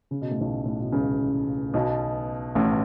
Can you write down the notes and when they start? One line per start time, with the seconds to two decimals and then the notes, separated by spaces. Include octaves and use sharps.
0.11 C#3
0.21 B2
0.31 A2
0.41 B1 B2
0.66 A2
0.80 B2
0.92 C#2 C#3
1.74 B1 B2
2.55 A1 A2